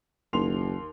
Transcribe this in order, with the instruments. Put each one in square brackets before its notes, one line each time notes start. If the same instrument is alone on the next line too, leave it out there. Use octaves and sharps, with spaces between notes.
[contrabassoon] F#1 [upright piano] D#2 C6 F7